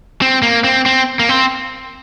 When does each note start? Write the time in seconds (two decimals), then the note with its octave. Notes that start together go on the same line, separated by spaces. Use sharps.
0.22 C4
0.43 A#3
0.64 C4
0.86 C4
1.19 A#3
1.29 C4